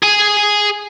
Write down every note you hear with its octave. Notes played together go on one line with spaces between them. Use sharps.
G#4 G#5